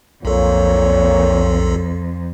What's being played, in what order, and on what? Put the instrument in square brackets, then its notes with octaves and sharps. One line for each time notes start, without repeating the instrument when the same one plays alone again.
[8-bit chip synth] B1 A4 [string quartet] F2 [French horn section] A#2 C#5